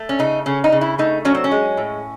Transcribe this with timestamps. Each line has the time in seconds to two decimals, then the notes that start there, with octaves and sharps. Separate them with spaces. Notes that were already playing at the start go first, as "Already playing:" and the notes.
Already playing: A3
0.09 C#4
0.19 C#3 D#4
0.46 C#3 C#4
0.64 D#4
0.72 C#3
0.81 E4
0.98 A3 D#4
1.25 F#3 C#4
1.35 C4
1.44 C#4
1.51 G#3
1.77 A2